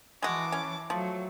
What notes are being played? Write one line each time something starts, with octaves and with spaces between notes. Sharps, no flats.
E3 G#3 F#4 A5 D6
C#4
F3 F#3 A3